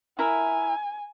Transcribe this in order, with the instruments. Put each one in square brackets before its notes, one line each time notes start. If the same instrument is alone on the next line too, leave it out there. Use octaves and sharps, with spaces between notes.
[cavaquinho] E4 A#4 E5 [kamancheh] G#5